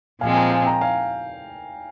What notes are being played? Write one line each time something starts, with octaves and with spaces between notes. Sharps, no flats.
A#2 F3 G#3 C4 F5 G#5
G5 A#5
F5 G#5
G5 A#5
F5 G#5